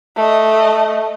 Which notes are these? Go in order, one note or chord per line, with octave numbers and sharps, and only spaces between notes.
A3 D#5